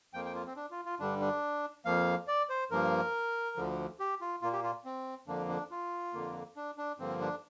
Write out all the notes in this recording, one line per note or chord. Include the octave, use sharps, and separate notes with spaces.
F2 F3 A#3 G5
G5
F4
C4
D4
F4
F4
G2 D3 G3 D4
D4
F2 F3 A#3 F5
D5
C5
G2 F3 A#3 A#4
D2 D3 F3
G4
F4
A#2 A#3 F4
G4
F4
C4
F2 D3 F3 A#3 D4
D4
F4
F2 D3 A#3
D4
D4
G2 D3 F3 A#3 C4
D4